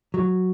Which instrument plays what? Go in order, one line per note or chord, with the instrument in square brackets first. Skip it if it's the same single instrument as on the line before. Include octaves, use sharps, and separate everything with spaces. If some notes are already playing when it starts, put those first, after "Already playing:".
[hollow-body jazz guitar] F#3